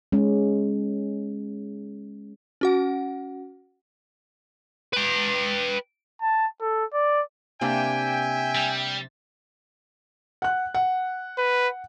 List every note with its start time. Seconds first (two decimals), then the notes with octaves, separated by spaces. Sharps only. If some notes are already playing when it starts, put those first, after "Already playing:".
0.12 G#3 C#4
2.61 C#4 F#4 F#5
4.93 B4 G5
6.22 A5
6.61 A4
6.93 D5
7.61 C3 A#3 D4 E5 G5 G#5
8.55 G3
10.42 F#5 F#6
10.74 F#5
11.38 B4